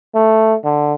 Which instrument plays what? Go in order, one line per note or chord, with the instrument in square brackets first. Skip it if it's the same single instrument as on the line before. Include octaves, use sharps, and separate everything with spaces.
[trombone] A3
D3